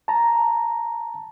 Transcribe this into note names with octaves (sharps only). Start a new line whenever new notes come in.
A5 A#5